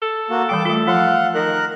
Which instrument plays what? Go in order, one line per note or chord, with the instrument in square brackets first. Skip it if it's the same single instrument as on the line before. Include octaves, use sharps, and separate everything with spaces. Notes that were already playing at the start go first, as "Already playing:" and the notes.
[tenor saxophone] A4
[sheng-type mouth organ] A#3 F#4
[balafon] E3 G3 G5 [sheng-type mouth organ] D6
[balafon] A3 F4 [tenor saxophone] A4
[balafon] F3 F4 [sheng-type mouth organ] F5 F#5
[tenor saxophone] D#3 [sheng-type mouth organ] A#4 F#6